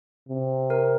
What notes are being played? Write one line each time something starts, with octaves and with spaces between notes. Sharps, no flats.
C3
A#4